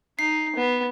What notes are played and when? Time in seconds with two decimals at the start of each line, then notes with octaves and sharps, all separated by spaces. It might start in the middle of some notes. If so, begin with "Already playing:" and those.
0.19 D#4 C7
0.56 B3